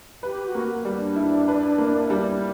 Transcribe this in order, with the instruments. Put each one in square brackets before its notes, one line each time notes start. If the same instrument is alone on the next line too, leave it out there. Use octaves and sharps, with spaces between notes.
[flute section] G4 [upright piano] B4
[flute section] F#4
[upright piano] A#3
G3
[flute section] D4
[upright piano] E4
B4
A#3
G3